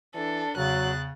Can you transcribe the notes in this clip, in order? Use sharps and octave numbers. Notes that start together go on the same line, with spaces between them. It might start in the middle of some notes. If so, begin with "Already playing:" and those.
E3 D4 A4
E2 C#3 F#3 F#6 A6